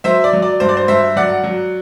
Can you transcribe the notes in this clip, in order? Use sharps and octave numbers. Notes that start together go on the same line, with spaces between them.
F#3 C5 E5
D5
F#3
D5
G2 C5
D5
C5
G2 C5 E5
F#3 D5 F#5
F#3